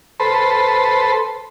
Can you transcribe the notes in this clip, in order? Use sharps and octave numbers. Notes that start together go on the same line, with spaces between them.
A4 B4 C5